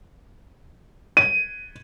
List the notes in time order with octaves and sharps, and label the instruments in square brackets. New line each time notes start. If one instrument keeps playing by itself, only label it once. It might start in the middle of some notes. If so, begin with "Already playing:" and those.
[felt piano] D#7